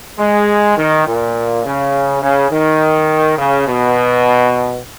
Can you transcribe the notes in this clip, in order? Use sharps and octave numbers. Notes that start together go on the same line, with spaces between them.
G#3
D#3
A#2
C#3
C#3
D#3
C#3
B2